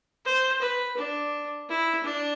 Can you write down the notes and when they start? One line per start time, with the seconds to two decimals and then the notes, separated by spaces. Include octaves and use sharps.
0.26 C5
0.61 B4
0.97 D4
1.69 E4
2.04 D4